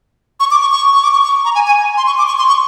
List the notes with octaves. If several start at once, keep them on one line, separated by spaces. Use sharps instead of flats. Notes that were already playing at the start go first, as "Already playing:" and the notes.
C#6
D6
C#6
C#6
C#6
D6
C#6
C#6
A#5
G#5
G#5
C6
C#6
D6
C#6
C6
C#6